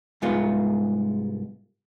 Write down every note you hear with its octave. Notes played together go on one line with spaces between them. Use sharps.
C2 G#2 G#3 B3 F4